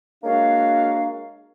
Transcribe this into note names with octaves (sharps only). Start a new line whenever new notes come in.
G#3 A#3 D4 F#4 C#5 F5